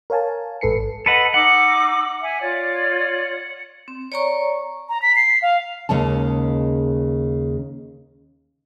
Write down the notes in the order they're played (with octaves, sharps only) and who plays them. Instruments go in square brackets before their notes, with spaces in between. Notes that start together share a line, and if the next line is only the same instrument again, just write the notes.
[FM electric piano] A#4 C#5 F5 G#5 A5
A1 G#2 A4 B4 C7 C#7
[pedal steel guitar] A4 B4 F#5 [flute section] D#5
[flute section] D#4 D6 E6 [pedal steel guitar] F#5
[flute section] E5 G#5
F4 C#5 D5
[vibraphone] C4
C#5 D5 A#5 C#6
[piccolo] A#5
B6
C7
F5
[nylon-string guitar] D#2 C#3 G#3 C#4 A5